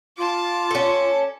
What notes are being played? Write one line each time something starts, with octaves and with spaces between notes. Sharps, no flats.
F4 A5 D6
C#4 A4